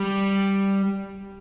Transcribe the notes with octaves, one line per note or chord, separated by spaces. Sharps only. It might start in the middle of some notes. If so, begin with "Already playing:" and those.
Already playing: G3